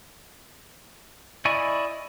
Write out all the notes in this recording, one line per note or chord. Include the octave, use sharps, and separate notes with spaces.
E4 D5 D#5 G#5 C#6